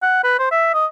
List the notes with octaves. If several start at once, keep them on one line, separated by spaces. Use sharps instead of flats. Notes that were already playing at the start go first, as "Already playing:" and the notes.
F#5
B4
C5
E5
D#5